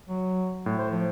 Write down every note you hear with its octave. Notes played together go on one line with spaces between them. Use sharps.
F#3
A2 F#3
C5
F3